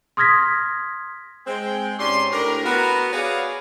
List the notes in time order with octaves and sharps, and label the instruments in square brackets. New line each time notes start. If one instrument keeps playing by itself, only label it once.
[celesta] C6 D#6 F6 G#6 A#6 B6
[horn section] G#3 C4 G5
G#2 C#4 G4 D5 C6
A2 D4 G4 A#4
B3 F#4 A#4
F#4 G#4 B4 C#5 D5 F5